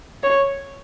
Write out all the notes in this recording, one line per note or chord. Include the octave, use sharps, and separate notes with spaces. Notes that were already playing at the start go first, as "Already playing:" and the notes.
C#5